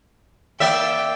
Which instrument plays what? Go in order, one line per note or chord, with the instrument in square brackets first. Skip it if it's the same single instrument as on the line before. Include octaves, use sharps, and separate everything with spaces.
[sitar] A#3 D5 E5 [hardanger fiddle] G5